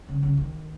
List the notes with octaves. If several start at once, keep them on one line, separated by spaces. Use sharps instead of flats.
C#3
C#3
D#3